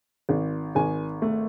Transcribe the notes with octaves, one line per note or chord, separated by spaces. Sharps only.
G#1
G#1 G#5
A3